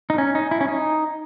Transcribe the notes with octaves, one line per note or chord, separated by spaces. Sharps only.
D#4
C#4
D#4
E4
C#4
D#4